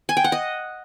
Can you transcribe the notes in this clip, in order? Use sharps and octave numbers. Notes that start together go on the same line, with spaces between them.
G#5
G5
F#5
D#5